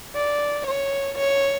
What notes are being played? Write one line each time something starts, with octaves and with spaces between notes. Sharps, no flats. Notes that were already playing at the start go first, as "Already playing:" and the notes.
D5
C#5
C#5